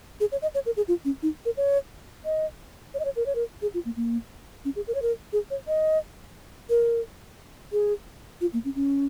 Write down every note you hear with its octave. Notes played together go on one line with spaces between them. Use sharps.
G#4
C#5
D#5
C#5
A#4
G#4
F4
C#4
D#4
A#4
C#5
D#5
C#5
D#5
C#5
A#4
C#5
A#4
G#4
F4
A#3
A#3
C#4
G#4
A#4
C#5
A#4
G#4
C#5
D#5
A#4
G#4
F4
A#3
C#4
C#4